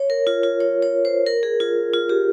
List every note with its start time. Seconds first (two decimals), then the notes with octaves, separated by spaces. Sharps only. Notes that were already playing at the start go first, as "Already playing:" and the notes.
Already playing: C#5
0.10 A#4
0.27 F4
0.43 F4
0.60 C#5
0.82 C#5
1.05 C5
1.26 A#4
1.43 G#4
1.60 F4
1.93 F4
2.09 G4